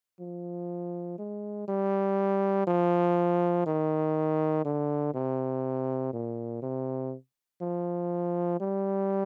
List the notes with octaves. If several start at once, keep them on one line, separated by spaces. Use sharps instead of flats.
F3
G#3
G3
F3
D#3
D3
C3
A#2
C3
F3
G3